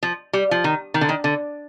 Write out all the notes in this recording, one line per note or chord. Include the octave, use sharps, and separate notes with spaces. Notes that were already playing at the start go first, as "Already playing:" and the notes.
F3
G3
F3
D#3
D#3
D3
D#3
D3